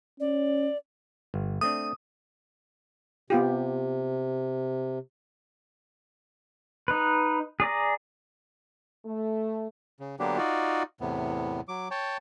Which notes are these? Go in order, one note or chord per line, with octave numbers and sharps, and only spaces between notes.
C#4 D5
G1
A3 C4 D4 D#6
C3 B3 F4 G4
D#4 B4
G#4 D5 A#5
A3
C#3
D3 F#3 A#3 B3 D4 G4
D#4 F4 F#4 D5
E2 A2 C3 B3
F#3 D6
C#5 G5 A5